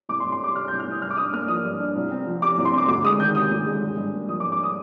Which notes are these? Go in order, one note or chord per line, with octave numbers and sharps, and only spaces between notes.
C2 D6
C6
C2
C6
G3 D6
C3 F6
C2 G6
F6
C2 D#6
G2 F6
D6
D4 D#6
A#3 F6
F3 D#6
G2
D4
C2
C4
F3
C3 D6
C2
C6
C4 D6
D2 D6
G#3 D#6
D#3 G6
C3 D#6
D2
G#3
G2
G2
A#3
F3 D#6
D6
G2
D6
D#6